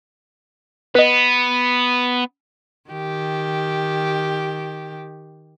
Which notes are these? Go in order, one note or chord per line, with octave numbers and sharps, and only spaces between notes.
B3 B4 D#5
D#3 G4